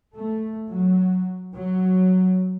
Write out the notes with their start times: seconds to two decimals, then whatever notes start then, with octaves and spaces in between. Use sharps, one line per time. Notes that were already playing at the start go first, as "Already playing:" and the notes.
0.16 A3
0.68 F#3
1.56 F#3